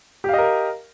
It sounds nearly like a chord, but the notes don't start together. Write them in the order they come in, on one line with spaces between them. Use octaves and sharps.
G4 F5 D#5 A#4